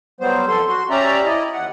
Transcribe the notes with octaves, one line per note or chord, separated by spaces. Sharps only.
F#3 G3 B3 C5
F2 A4 C6
F#4 C6
C#4 G4 D5 E5 A#5
E4 D5 D#5
D#2 F#5